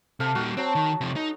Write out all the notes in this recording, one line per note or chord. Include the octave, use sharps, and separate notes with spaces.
C3 A4 F5 G5
A#2 G3 F#4
F#3 C4 A5
D#3
C3 F3
D#4